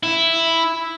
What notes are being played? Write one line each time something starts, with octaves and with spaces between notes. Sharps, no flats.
E4